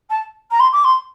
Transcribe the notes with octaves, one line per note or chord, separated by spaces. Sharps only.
A5
A#5
C6
D6
C6